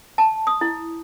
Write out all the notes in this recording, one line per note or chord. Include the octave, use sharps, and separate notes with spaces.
A5
D#6
E4